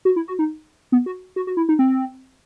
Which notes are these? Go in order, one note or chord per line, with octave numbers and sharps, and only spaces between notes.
F#4
E4
F#4
D#4
B3
F#4
F#4
F#4
E4
D#4
C4